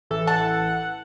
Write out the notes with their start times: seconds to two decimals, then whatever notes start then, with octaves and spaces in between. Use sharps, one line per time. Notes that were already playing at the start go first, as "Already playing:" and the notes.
0.10 A1 E3 A4
0.27 F#5 A5